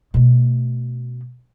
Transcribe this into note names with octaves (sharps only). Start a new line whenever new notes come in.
B2 A3